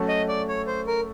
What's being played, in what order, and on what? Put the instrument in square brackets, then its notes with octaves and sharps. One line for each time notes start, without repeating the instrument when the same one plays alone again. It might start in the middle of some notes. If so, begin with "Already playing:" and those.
Already playing: [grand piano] F#3 A3 C#4 F#4 A4
[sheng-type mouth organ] D#5
D5
C#5
C5
A#4